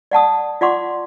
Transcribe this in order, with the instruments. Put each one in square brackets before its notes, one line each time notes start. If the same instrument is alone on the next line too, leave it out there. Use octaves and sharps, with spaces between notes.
[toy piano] D5 F#5 A5 D#6
F4 D5 F#5 C6 D6